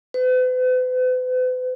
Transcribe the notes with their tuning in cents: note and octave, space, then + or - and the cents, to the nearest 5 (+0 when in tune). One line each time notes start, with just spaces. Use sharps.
B4 +45